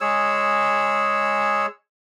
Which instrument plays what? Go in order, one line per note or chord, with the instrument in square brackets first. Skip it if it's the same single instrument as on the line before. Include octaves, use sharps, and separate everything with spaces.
[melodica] G#3 G#4 C#5 E6